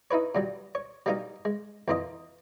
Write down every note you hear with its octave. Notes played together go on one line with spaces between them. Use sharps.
D#4 E4 B4 C#5
A#2 F#3 G3
C#5
F#3 G3 A#3 D#4 A#4
G#3
F2 E3 A#3 F4 D#5